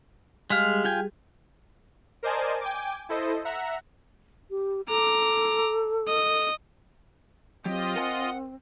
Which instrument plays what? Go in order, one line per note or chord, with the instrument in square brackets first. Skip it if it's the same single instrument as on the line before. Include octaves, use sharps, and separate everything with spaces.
[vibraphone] G3 G4 G#4 [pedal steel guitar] G#3 F5
[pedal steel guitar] F4 G5 G#5
[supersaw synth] A#4 C5 D5 D#5 G#5 A5
G5 G#5 D6
E4 A4 C5 D#5
E5 F#5 A#5
[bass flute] G4
[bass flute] A4 [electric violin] A#5 D6
[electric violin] D#5
[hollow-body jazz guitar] F#3 [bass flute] C4 [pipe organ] F4 D#5 [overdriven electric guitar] G4
[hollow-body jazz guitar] A#4 G#5 [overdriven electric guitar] F#5